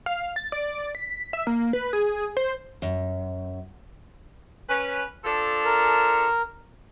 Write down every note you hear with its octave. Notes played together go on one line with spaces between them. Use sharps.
F5
A6
D5
B6
E5
A#3
B4
G#4
C5
F#2
C#4 B4
F3 D4 A4
A#4